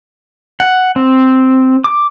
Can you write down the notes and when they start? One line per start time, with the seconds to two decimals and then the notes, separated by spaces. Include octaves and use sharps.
0.60 F#5
0.96 C4
1.84 D6